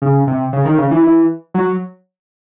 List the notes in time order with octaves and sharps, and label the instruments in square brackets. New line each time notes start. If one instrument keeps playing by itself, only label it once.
[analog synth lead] C#3
C3
C#3
D#3
C#3
E3
E3
F#3